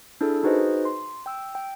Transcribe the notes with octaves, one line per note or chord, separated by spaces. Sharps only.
D4 E4 G#4 A4
D#4 F#4 G#4 B4 C5 D#5
C6
G5 E6
G5